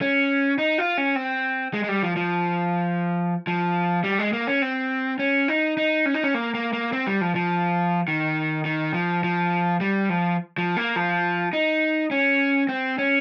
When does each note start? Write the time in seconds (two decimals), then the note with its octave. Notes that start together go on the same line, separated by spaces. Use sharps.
0.01 C#4
0.58 D#4
0.78 F4
0.98 C#4
1.16 C4
1.74 G#3
1.84 G#3
1.89 G3
2.03 F3
2.16 F3
3.47 F3
4.04 G3
4.19 G#3
4.33 A#3
4.47 C#4
4.62 C4
5.19 C#4
5.48 D#4
5.77 D#4
6.06 C#4
6.14 D#4
6.24 C#4
6.34 A#3
6.54 A#3
6.73 A#3
6.93 C4
7.07 G3
7.21 F3
7.35 F3
8.08 D#3
8.65 D#3
8.94 F3
9.24 F3
9.81 G3
10.09 F3
10.58 F3
10.77 A#3
10.96 F3
11.53 D#4
12.11 C#4
12.69 C4
12.98 C#4